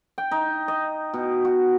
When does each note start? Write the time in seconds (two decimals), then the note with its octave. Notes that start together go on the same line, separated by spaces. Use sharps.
0.18 G5
0.31 D#4
0.68 D#5
1.14 B2
1.45 F#4